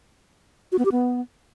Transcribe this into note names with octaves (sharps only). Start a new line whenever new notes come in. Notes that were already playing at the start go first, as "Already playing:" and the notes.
F#4
B3
G4
B3